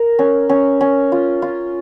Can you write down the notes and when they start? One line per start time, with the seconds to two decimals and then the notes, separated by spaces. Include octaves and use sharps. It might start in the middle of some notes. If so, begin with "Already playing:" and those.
Already playing: A#4
0.19 C#4
0.49 C#4
0.81 C#4
1.12 F4
1.42 F4